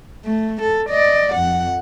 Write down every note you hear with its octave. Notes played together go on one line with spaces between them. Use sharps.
A3
A4
D5 D#5
F2 F#5